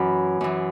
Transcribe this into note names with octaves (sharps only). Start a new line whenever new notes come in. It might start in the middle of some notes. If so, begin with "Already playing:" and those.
Already playing: F#2 E3 B5
F#2 E3